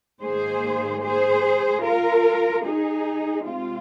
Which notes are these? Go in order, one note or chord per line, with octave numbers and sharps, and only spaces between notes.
G#2 D#3 A#3 G#4 C5
G#4 C5
F4 A#4
D#4 G#4
C3 G#3 C4 F4